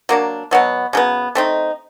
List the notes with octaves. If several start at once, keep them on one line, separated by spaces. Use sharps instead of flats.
F#3 A#3 D4
B2 F#3 B3
C#3 F#3 B3
A3 C4 D#4